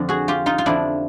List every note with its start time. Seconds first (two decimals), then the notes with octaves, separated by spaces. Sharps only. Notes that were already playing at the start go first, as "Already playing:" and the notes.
Already playing: F2 D3 F3
0.09 F#4 G#4
0.28 F4 G4
0.46 D#4 F4
0.58 F4
0.66 F2 D3 F3 D4 E4